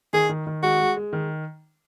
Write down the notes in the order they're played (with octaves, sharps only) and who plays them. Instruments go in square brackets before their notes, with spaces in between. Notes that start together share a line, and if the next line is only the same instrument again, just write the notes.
[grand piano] D#3 [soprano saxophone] G#4
[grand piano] D#3
D#3
[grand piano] G#3 [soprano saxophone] F#4
[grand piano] G#3
G#3
D#3